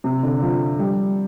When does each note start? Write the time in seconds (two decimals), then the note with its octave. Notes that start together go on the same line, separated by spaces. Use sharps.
0.04 C3
0.23 D3
0.42 F3
0.79 G3